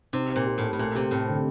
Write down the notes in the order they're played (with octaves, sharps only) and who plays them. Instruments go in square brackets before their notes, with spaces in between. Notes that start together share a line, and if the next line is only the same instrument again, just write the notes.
[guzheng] C3 [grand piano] D#4
[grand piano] C5
[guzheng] A#2
[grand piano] G4
[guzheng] A2 [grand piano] A3
[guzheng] A2
[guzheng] A#2 [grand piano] A3
[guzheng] C3 [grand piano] G4
[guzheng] A2 [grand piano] C4
[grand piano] D3